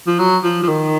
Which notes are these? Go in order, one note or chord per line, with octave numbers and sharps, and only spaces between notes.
F3
F#3
F3
F3
D#3